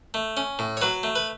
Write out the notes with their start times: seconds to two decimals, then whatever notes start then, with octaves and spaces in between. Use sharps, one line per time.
0.14 A3
0.37 C#4
0.59 A2
0.77 C#5
0.81 F#3 B4
1.03 A3
1.16 B4